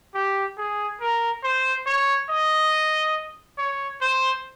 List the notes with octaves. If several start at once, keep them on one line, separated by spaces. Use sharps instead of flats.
G4
G#4
A#4
C5
C#5
D#5
C#5
C5